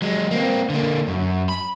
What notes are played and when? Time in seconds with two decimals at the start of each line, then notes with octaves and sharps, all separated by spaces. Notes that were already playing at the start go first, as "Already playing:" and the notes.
0.02 F#3 G#3
0.31 A#3 C4
0.70 D3 A#3
1.08 F#2
1.49 B5